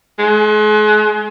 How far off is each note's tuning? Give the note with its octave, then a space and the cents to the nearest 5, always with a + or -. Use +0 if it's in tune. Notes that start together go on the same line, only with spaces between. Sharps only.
G#3 +40